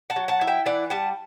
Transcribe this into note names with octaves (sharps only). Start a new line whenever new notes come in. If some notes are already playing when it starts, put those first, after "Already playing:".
F#5 A5
F#3
F#5 A5
E4
E5 G5
E3 D5 F#5
G3 F#5 A5